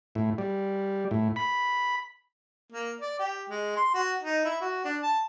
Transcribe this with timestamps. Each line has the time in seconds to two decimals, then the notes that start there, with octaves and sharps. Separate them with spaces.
0.15 A2
0.38 G3
1.11 A2
1.36 B5
2.72 A#3
3.01 D5
3.19 G4
3.50 G#3
3.77 C6
3.94 F#4
4.23 D#4
4.45 E4
4.61 F#4
4.84 D4
5.03 A5